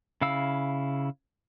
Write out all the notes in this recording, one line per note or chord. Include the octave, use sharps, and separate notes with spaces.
C#3 E4 F5 E6